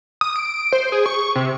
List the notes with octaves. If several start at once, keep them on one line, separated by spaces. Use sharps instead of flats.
D#6
D7
C5
G#4
C#6
C3